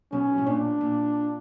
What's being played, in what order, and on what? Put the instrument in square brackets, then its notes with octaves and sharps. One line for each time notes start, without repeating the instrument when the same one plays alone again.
[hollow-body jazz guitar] B1 B2 [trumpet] C#4
[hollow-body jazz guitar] A2
[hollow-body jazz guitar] A#2 [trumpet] D4
[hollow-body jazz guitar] A#2